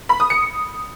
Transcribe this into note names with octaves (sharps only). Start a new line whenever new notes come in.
B5
D#6
C#7